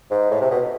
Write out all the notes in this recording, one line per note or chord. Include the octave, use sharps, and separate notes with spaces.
G#2
A2
C3
B2